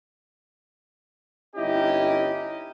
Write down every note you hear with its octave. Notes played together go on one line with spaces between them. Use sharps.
G1 C#4 D#4 E4 G4 D#5